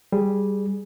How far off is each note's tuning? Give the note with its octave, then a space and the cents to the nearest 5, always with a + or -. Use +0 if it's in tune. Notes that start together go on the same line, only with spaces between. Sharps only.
G3 +0 G#4 +0